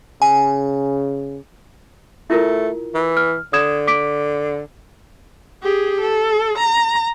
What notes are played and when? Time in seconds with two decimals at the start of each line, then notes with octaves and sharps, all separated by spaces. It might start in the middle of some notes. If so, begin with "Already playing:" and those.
0.22 C#3 G#5
2.30 A3 E4 F4 A#4
2.94 E3
3.17 F6
3.53 D3 D#6 G#6 E7
3.87 D6 B6 D7
5.63 G4 G#4
6.00 A4
6.58 A#5